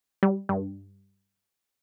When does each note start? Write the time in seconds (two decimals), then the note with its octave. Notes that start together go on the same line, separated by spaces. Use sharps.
0.23 G3
0.49 G2